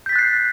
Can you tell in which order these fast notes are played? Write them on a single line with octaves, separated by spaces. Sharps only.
G6 B6 A6 F#6 C7